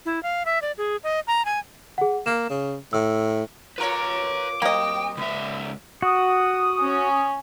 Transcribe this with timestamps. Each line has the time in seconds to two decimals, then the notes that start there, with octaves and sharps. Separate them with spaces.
0.06 E4
0.23 F5
0.46 E5
0.62 D5
0.78 G#4
1.04 D#5
1.27 A#5
1.45 G#5
1.98 G#4 F#5
2.26 A#3 E7
2.50 C#3
2.93 A2 E6
3.78 F4 A#4 B4 C#5 A#5 D6
4.62 F#3 A#3 C4 D#5 G5
5.17 C#2 B3 E5
6.02 F#4 D#6
6.82 C#4